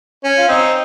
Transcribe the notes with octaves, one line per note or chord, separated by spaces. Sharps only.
C#4
F4
C4 D#4